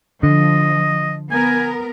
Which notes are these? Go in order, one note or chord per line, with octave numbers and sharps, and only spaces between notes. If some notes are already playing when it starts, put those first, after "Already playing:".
D3 F3 D#5
B3 A#4 G#5